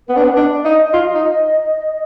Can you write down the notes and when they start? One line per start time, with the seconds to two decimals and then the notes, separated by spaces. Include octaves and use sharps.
0.08 B3 B4
0.17 D4
0.24 B3
0.36 D4 D#5
0.41 D5
0.65 D#4 D#5 F5
0.94 F4
1.15 D#4